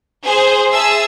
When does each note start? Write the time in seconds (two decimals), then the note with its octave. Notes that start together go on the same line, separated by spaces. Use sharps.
0.24 G#4 C5
0.72 G#4 E5 A5 E6